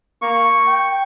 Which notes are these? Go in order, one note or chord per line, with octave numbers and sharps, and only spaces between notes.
A#3 C#6
G5